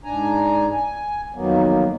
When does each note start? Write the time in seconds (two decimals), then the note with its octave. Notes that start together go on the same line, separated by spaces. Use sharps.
0.04 G#2 D4 G#5 A#5
0.73 G#5
1.34 F2 D#3 F#3 A#3 B3